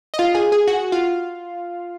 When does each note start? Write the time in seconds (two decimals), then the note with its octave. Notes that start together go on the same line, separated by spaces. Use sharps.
0.14 D#5
0.19 F4 F5
0.35 G#4 G#5
0.52 G#4 G#5
0.67 F#4 F#5
0.92 F4 F5